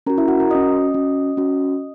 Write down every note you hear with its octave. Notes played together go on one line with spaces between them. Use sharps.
C#4 F#4 A#4 A#5
E4 E5
F#4 F#5
A#4 A#5
C#4 F#4 D#5 D#6
C#4 F#4
C#4 F#4